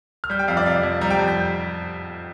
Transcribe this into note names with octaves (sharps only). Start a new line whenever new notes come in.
F6
G3 G6
G5
F2 F5
D5
C3 F5
F2
G3 A#5
G5
F2
G6